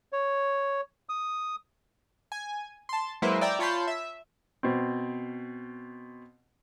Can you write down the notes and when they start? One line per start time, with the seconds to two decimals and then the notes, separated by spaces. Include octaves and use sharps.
0.13 C#5
1.09 D#6
2.32 G#5
2.89 A5 C6
3.22 F#3 G#3 A#3 E4 B4 C5
3.41 D5 E5 G5 A#5
3.59 F4 C#5 A5 B5 C6 G6
3.87 E5
4.63 B2 C4